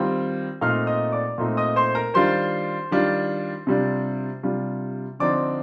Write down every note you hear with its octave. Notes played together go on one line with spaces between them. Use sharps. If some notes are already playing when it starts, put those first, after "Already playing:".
Already playing: D#3 G3 C4 F4
A#2 A3 C4 D#4 F5 F6
D#5 D#6
D5 D6
A#2 A3 C4 D#4
D#5 D#6
C5 C6
A#4 A#5
D#3 G3 D4 F4 C5 C6
D#3 G3 D4 F4
C3 G3 D4 F4
C3 G3 D4 F4
D3 F3 C4 D#4 D5 D6